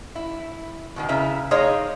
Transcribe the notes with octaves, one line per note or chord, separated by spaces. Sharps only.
E4
B2 D3 D#3
C#3 E4 B4 E5 A#5
A#3 D#4 G#4 C5 C#5 D#5